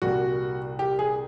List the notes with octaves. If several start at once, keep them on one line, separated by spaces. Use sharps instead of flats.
C2 A#2 G3 F#4
G4
G#4